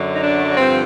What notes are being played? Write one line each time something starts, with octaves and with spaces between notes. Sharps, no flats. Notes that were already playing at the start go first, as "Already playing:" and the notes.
Already playing: F#2 D3 F#3
D#4
D4
G2 D3 F3 C4